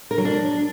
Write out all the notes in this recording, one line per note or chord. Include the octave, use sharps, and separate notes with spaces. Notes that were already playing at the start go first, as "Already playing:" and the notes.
A#4
F#3
D4